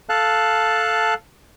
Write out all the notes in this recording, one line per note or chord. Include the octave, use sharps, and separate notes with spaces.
A4 F5 A5 F#6